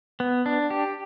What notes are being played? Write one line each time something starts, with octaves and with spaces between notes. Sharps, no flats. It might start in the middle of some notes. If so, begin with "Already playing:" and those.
B3
D4
G4